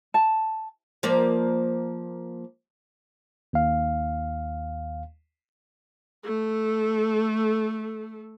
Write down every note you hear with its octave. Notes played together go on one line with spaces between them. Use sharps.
A5
F3 A#3 D5
D#2 F5
A3 A4